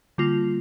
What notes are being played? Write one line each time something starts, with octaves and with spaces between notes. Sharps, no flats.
D3 G3 A#3 F4